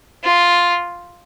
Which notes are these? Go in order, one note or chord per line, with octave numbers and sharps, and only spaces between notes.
F4